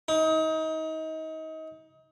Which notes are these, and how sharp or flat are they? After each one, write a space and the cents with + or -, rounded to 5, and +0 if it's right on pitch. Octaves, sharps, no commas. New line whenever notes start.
D#4 +30